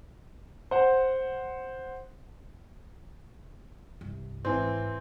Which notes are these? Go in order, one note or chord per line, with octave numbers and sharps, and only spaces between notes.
C5 F#5
C2 G2
G#1 E3 C4